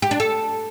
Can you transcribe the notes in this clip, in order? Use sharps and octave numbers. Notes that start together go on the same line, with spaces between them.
G4
D4
A4